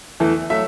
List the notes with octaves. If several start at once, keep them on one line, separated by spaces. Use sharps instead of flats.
E2 E3 A3
F#3 A3 E5